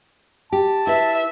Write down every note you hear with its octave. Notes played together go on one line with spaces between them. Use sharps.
G4 A5
E4 B4 E5